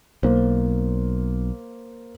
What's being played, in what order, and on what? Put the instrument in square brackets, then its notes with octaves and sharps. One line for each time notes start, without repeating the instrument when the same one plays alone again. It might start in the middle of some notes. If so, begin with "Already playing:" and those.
[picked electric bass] B1 [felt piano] A#3 C5